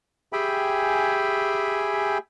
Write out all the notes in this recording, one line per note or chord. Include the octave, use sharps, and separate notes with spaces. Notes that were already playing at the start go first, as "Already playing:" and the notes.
G4 G#4 E5 G5 G#5 B5